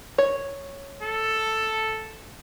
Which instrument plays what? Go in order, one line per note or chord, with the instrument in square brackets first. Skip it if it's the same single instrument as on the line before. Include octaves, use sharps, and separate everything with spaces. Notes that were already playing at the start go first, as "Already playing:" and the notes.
[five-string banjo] C#5
[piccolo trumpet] A4